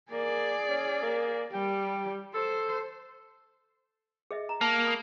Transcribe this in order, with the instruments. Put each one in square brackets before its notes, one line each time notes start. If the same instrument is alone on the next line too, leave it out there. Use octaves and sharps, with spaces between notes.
[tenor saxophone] A#3 [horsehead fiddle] G#4 D5
[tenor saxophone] C#4
A#3
[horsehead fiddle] G3 [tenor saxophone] G4
[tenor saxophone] A4 [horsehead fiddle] C5
[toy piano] G#4 D#5 E5
A#5
[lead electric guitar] A#3 [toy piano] A5
[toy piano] B5 D#6